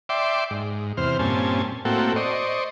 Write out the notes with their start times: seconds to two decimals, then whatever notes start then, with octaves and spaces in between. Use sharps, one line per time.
0.09 D5 E5 G5 C6 D6
0.51 G#2
0.97 E2 C3 C5 F6
1.19 G2 A#2 C4 C#4 G#5 A5
1.85 A2 A#3 C4 F#4 A4 G5
2.16 C5 D5 D#5 C#6